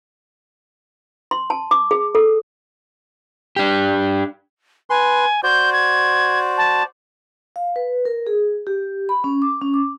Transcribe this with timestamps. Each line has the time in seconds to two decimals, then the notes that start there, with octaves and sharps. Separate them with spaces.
1.31 C6
1.50 A5
1.71 D6
1.91 G#4
2.15 A4
3.56 D4 G4
4.90 B4 G#5 C6
5.43 F#4 C5 D5 G6
5.73 G#6
6.58 A5
7.56 F5
7.76 B4
8.05 A#4
8.27 G#4
8.67 G4
9.09 B5
9.24 C#4
9.42 D6
9.62 C#4
9.74 D6